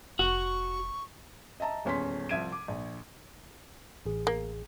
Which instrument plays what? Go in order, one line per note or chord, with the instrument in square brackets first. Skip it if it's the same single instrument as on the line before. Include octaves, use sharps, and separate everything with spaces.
[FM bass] F1 [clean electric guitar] F#4 [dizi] C#6
[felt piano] D#5 E5 A5 A#5
D#1 E2 C#4 C6 B6
C2 F3 E5 G#6 D7 D#7
D6
A#1
[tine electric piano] A1 G#4
[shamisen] A#3